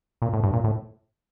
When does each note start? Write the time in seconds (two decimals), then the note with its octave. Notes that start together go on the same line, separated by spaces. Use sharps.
0.22 A#2
0.33 A2
0.44 G2
0.53 A#2
0.64 A2